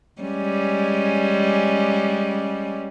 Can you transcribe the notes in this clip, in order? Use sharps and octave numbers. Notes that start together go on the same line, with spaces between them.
G3 G#3 C#4